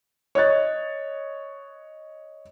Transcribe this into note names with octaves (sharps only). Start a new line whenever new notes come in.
C#5 D#5 C#6 F#6 A6